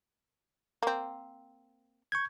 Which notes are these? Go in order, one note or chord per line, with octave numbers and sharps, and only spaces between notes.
A#3 C4
C#6 G6 G#6